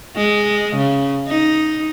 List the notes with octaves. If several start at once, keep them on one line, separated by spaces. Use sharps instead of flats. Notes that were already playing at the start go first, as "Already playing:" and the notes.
G#3
C#3
D#4